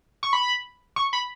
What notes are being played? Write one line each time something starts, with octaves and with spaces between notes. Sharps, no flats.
C#6
B5
C#6
B5